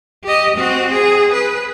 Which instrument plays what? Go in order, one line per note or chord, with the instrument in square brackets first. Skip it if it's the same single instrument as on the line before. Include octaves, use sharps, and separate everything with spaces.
[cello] G4 D#5
C4 F#4
G#4
B4